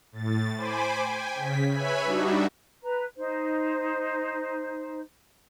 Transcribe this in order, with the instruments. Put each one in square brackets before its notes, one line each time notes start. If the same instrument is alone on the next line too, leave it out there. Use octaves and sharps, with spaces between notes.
[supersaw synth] A2 A6
C5 G#5 B5 D6
G5 G#5
C#3 B6
B4 C#5 E5 G#5 B5
G3 D4 D#4 F#4 E5
[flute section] B4 A#5
D#4 C5